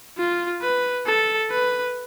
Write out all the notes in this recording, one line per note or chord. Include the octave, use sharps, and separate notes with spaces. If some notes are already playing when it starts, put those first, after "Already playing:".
F4
B4
A4
B4